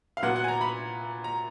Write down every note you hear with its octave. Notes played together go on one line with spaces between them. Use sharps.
F5
A#2 F#3 B3 F#5
F#5
G#5
A#5
B5
A#5